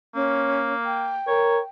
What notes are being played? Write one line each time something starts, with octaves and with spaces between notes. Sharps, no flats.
A#3 C#4
G5
A#4 C#5